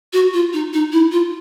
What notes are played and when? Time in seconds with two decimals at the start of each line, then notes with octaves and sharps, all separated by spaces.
0.13 F#4
0.34 F4
0.53 D#4
0.73 D#4
0.92 E4
1.12 F4